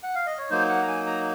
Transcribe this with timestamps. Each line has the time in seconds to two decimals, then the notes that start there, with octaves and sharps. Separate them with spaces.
0.03 F#5
0.15 F5
0.27 D#5
0.38 C#5
0.50 F#3 A#3 D#4 C5
0.69 F#5
0.82 A#5
0.87 G#5
1.07 A#5